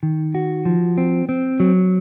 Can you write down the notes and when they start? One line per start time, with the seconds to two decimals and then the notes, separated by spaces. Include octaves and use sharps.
0.03 D#3
0.35 F#4
0.65 F3
0.98 C4
1.29 C4
1.60 F#3